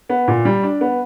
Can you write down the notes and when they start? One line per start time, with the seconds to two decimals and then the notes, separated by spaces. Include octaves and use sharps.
0.10 B3
0.28 A#2
0.45 G3
0.63 D4
0.81 B3